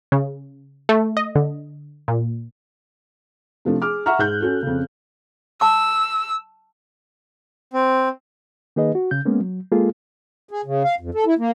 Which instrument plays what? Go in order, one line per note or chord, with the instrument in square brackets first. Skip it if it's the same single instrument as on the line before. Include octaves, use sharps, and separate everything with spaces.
[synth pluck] C#3
A3
D#5
D3
A#2
[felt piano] C3 F3 A3 D4
G#4 D6 F6
E5 F#5 A#5 C#6 F6
G#2 F#6 G6
C#4 F#4 A4
F2 C#3
[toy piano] A5 D6 [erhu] E6
[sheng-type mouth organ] C4
[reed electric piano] D#3 A#3 D#4 G#4 B4 D#5
F#4
C#3 G6
G#3 A#3 B3 C#4
F#3
G#3 A#3 F4 G#4 A4
[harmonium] G#4
C#3
F5
F2
A4
E4
A#3